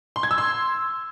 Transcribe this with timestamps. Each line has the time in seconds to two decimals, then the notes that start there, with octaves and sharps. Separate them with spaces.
0.16 C6
0.23 G#6
0.31 E6
0.38 C6